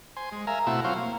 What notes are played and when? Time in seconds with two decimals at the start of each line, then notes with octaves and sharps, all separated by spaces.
0.17 C5 G#5 C6
0.32 G#3
0.47 A#4 E5 F5 G#5 A#5
0.67 B2 A3 C4 E4 F#4 E6
0.84 F#3 C4 F4 C5 C#5 F5
0.97 A#3